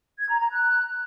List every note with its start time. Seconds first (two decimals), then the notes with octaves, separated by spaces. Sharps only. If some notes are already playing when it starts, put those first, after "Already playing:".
0.18 G#6
0.29 A#5
0.39 A#5
0.50 F#6